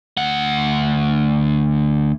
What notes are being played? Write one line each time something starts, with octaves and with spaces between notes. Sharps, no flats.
D2 F#5